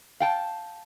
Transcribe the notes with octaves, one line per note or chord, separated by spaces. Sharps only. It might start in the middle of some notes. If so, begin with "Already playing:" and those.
F5 G5 A5